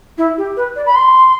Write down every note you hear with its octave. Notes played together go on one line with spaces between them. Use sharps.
E4
G4
B4
D5
B5
C6